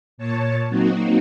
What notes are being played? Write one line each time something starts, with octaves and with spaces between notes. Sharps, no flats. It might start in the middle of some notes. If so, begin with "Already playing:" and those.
A#2 C#5 A5
F#3 A#3 C4 D#4 F#4